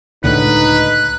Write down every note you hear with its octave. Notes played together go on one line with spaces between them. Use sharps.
C#2 A2 D3 D#4 B4 F#6